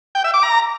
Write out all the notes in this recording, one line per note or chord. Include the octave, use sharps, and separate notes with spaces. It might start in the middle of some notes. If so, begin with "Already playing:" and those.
G5
E5
D6
A#5